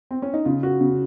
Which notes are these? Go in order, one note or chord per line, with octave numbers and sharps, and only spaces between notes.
C4
C#4
D#4
C#3 F4
F#4
C#3